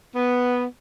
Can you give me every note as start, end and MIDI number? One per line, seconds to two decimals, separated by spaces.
0.15 0.64 59